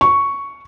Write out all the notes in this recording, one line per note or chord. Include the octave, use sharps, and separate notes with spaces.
C#6